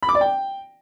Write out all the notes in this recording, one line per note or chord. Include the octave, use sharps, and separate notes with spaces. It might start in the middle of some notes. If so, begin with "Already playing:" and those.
B5
D6
D5
G5